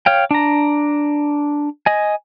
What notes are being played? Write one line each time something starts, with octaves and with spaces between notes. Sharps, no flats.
C#5 F5 G5
D4 A#5
D#5 G#5